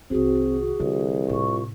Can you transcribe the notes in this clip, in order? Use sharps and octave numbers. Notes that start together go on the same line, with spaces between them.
C2 D#3 C4 F#4 G#4
C2 D3 E3
A2 C3 F4 C#6